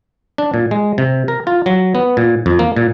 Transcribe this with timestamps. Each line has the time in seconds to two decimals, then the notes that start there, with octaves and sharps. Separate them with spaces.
0.38 D4
0.54 A#2
0.71 G#3
0.98 C3
1.28 A#4
1.47 F4
1.66 F#3
1.95 B3
2.17 A#2
2.46 F2
2.59 A#3
2.76 A#2